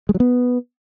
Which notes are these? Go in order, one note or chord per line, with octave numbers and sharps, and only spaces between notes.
G#3
F#3
B3